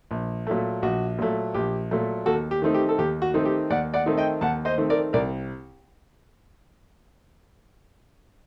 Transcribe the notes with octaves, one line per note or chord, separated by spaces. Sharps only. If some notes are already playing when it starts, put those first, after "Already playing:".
A#1
A#2 F#3 A3
A#1 F#4
A#2 F#3 A3
A#1 G4
A#2 F#3 A3
D#2 F#4 A4
G4
D#3 A3 C4 D#4
G4
A4
D#2 G4
F#4
D#3 A3 C4 D#4
G4
D#2 D5 F#5
D5 F#5
D#3 A3 C4 D#4
D#5 G5
D#2 F#5 A5
C5 D#5
D#3 A3 C4 D#4
A#4 D5
C2 A#4 D5